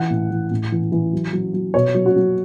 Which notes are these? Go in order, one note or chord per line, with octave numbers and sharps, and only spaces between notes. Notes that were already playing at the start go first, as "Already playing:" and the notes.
Already playing: E3 F#5
A2
E3
A2
E3
E3
F#3
F#3
F#3
B2 C#5
F#3
F#4
F#3